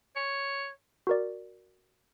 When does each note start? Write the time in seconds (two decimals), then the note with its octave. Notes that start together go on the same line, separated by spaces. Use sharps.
0.16 C#5
1.07 F#4 A#4 D5